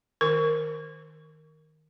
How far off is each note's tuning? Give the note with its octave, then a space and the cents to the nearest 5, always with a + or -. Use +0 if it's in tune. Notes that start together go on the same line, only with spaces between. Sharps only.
D#3 +0 A#4 +0